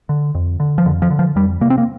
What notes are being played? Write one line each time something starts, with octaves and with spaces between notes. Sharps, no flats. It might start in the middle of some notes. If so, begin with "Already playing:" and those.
D3
F2
D3
F3
F2 D3
F3
D3
F3
F2 G3
C3 A#3
C4
A#3